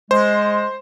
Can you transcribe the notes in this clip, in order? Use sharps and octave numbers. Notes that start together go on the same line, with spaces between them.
G#3 C5